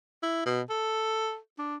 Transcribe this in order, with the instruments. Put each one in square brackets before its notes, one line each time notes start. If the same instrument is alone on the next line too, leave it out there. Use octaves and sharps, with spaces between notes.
[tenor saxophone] E4
B2
A4
D4